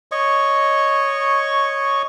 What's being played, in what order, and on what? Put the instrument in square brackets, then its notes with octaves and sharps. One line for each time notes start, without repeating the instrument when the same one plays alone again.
[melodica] C#5 D#5 C#6